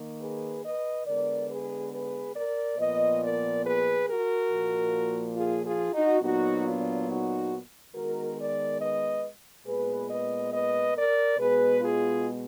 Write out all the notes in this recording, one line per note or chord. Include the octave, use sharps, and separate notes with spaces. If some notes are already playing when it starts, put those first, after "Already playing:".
Already playing: D#3 A#3
G#4 B4
B4 D#5
D3 G#3 B3 A#4 D5
G#4 B4
G#4 B4
A#4 D5
A#2 F3 B3 B4 D#5
A#4 D5
G#4 B4
F#4 A#4
A#2 F3 A#3
F4 G#4
F4 G#4
D#4 F#4
A#2 F#3 B3 D#4 F#4
D4 F4
D#4 F#4
D#3 G#3 B3 F#4 A#4
A#4 D5
B4 D#5
A#2 G#3 B3 G#4 B4
B4 D#5
B4 D#5
A#4 D5
B2 G#3 B3 G#4 B4
F4 G#4